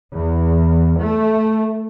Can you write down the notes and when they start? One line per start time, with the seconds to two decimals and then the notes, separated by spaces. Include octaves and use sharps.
0.14 E2
1.00 A3